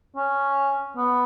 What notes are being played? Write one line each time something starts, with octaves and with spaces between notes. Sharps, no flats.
C#4
B3